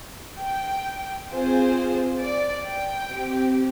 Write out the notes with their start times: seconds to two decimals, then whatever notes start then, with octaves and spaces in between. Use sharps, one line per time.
0.42 G5
1.31 C4 F4 G#4 C5
2.22 D5
2.66 G5
3.11 C4 G4